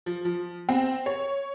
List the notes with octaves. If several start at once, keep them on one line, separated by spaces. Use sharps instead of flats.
F3
F3
C4
C#5